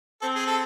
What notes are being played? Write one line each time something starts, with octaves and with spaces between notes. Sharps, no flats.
C4 A4
G#4
A4